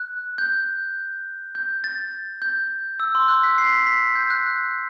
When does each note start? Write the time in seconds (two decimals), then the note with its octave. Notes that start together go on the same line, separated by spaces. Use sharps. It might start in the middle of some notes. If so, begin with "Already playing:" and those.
Already playing: F#6
0.38 G6
1.55 G6
1.84 A6
2.42 G6
3.00 E6
3.15 C6
3.28 F#6
3.43 B6
3.58 C7
3.73 B6
3.87 B6
4.15 G6
4.30 F#6